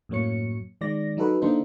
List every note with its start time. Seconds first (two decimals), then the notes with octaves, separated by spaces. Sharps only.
0.09 F#2 A2 F#3 A#3 C#5 C#7
0.81 D#3 G#3 D5 A#6
1.17 F#3 D#4 F#4 A4 B4
1.41 D3 A#3 D4 D#4 A4 C5